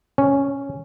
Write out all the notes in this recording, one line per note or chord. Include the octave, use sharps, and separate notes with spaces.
C#4